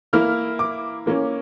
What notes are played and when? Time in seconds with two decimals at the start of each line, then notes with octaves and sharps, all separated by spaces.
0.13 E3 A#3 E4 F6
0.59 D6
1.06 E3 A#3 C#4